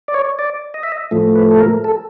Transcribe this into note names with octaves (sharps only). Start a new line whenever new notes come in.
D5
C#5
D5
D#5
E5
D#5
A2 F3 A3
B4
A4
A#4
A4